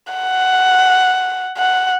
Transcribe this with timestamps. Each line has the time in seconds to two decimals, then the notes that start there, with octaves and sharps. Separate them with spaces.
0.13 F#5
1.58 F#5